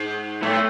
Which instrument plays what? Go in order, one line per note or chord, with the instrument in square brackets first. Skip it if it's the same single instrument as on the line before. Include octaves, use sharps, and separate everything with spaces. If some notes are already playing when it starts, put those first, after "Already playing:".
Already playing: [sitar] G#2
[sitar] A2 [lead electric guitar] A3